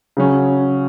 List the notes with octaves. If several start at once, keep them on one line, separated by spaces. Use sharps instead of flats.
C#3 F#3 C#4